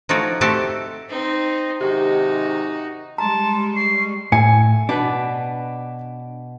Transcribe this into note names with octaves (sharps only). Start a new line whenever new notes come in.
F3 A3 D#4 F#4 C#5 D5
A3 C4 F#4 G4 A4 A5
C4 D#4
G#2 C3 D#3 D#4 F#4 G4
G3 G#3 A5 A#5 C6
C#6 C7
A2 G#5 C#7
B2 D4 B4